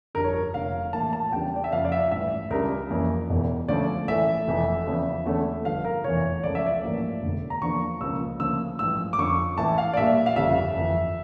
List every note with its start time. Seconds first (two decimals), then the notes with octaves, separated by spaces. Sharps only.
0.15 G1 F2 D3 G3 D4 A#4
0.24 C#5
0.34 A#4
0.54 F1 F2 D3 F5
0.93 A#1 A2 E3 A#3 A5
1.13 A5
1.32 E2 C#3 G3 D4 G5
1.56 D5
1.64 E5
1.72 F2 C#3 F3 F5
1.85 D5
1.92 E5
2.11 A1 G2 E3 E5
2.50 C#2 C#3 G3 D4 A#4
2.90 F2 E3 A#3 C#4
3.29 E1 E2 E3
3.68 D2 D3 F3 A3 C#4 D5
4.08 A1 A2 E3 A3 E5
4.47 F1 F2 E3 A3
4.86 E2 C#3 F3
5.25 E2 D3 A3 C#4
5.65 G1 G2 F3 F5
5.85 A#4
6.04 F1 E2 E3 C#5
6.43 C#2 C#3 F3 A3 D5
6.55 E5
6.66 D5
6.83 A1 G2 F3 A#3 C#4
7.22 E1 D2 D3
7.50 A#5
7.61 E2 D3 F3 A#3 D4 C#6
8.01 C#2 C#3 F3 A#3 C#4 E6
8.40 D2 C#3 F3 A#3 D4 E6
8.79 A1 G2 F3 E6
9.13 D6
9.18 F2 D3 F3 C#4 C#6
9.58 A1 A2 E3 A5
9.78 F5
9.93 D5
9.97 A#1 A#2 G3 D4 E5
10.26 F5
10.36 G1 F2 C#3 G3 E5
10.76 G1 F2 E3